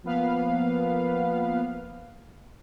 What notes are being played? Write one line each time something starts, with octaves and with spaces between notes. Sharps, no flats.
F3 A#3 B3 B4 F5